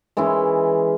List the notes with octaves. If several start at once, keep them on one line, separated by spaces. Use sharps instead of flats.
E3 G#3 C#4 E4